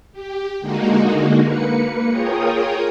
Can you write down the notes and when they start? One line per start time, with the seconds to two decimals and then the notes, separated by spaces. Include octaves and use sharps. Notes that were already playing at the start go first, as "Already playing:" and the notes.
0.12 G4
0.61 D3 G#3 A#3 D#4 F#4
1.41 A#3 B4 C#7
2.10 F4 G#4 A#4 C#5 G5 D#6